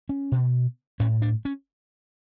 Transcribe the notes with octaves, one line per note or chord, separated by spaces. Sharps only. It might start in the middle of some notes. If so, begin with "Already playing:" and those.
C#4
B2
A2 C#4
D4
C#4